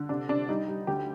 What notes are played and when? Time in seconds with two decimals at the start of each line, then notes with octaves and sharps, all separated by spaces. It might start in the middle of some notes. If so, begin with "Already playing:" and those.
Already playing: D3
0.09 C3 D4
0.29 C3 D4
0.49 G3 D#4
0.68 G3
0.87 D2 G4